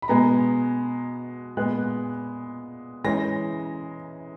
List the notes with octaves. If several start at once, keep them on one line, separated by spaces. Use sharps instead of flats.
B5
B2 G#3 B3 A#5
A#2 G#3 B3 F#6
E3 G#3 C#4 A#6